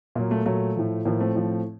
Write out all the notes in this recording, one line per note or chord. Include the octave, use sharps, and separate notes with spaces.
A#2 F#3 A#3
A3
A#2 F#3 A3
A2 F3
A2 F3 A#3
A3 C4
A2 F3